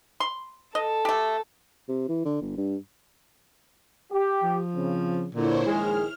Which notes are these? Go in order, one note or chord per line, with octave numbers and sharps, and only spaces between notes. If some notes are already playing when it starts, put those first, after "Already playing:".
C6
A4 D#5
A3 G4
C3
E3
D3
G1
G2
G4
F3
C#3 C4
A#2 D3 E4 C5 C#5
A#1 D#3 G#3 G#4 F6